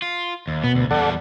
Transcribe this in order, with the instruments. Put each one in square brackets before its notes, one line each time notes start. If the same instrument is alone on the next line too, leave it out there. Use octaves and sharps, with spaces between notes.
[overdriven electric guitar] F4
D#2
[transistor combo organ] B2 [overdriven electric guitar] B3
[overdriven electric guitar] D2
[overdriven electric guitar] E2 G3 [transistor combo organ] A4 D5 F#5